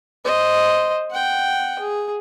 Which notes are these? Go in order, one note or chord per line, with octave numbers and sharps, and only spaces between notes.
C5 D#5
F#5 G5
G#4